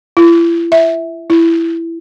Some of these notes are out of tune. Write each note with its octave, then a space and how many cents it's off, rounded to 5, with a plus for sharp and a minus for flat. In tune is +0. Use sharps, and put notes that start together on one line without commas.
E4 +40
E5 -10
E4 +10